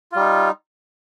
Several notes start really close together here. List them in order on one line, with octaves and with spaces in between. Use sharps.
F4 G3 D#4